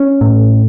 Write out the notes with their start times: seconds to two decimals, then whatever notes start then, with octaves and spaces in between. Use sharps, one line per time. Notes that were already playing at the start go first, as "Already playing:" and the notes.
Already playing: C#4
0.21 A2